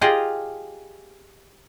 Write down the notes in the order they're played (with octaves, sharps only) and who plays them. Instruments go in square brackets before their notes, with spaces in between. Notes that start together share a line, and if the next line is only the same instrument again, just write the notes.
[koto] F4 G4 G#4 D#5 F5